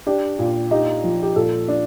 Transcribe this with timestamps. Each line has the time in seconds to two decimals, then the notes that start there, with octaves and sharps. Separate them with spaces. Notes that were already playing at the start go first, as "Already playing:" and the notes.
0.07 D4 G4
0.39 A#2
0.71 D#4 G4
1.04 F3
1.23 G4
1.36 A#2 A4
1.68 D4